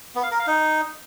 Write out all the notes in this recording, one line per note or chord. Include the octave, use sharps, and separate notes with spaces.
B3
F5
A#4
F5
D#4